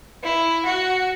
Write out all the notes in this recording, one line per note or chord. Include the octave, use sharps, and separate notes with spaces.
E4
F#4